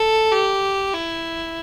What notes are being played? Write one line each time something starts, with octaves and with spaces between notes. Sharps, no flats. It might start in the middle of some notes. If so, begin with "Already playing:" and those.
Already playing: A4
G4
E4